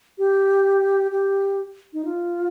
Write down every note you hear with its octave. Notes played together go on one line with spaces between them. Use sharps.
G4
G4
D#4
F4